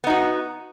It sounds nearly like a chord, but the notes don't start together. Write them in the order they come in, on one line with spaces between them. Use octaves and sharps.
B3 D#4 F#4